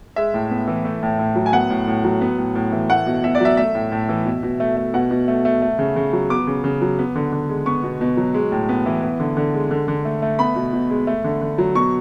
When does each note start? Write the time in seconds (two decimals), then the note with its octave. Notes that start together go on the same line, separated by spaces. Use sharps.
0.16 G#3 E5
0.34 A2
0.51 B3
0.68 E3
0.85 A3
1.03 A2
1.19 A2
1.36 F#3
1.46 G#5
1.53 B3 F#5
1.70 A2
1.87 A2
2.04 F#3
2.21 B3
2.38 A2
2.55 A2
2.72 E3
2.89 A3 F#5
3.07 B2
3.23 B2 E5
3.35 D5
3.40 F#3 E5
3.57 A3 E5
3.75 A2
3.92 A2
4.09 E3
4.26 B2
4.43 B2
4.60 A3
4.77 A3
4.94 B2 F#5
5.11 B2
5.28 A3
5.45 A3
5.62 A3
5.79 C#3
5.96 C#3
6.13 F#3
6.30 B3 D6
6.47 C#3
6.64 C#3
6.81 F#3
6.99 B3
7.15 D3
7.32 D3
7.49 G#3
7.66 B3 C#6
7.83 B2
8.01 B2
8.17 F#3
8.34 G#3
8.52 A2
8.69 B3
8.86 E3
9.03 B3
9.20 D3
9.37 D3
9.54 G#3
9.71 D3
9.88 D3
10.05 A3
10.22 A3
10.39 B3 B5
10.56 B2
10.73 B2
10.90 G#3
11.07 A3
11.24 D3
11.41 D3
11.58 F#3
11.75 B2 C#6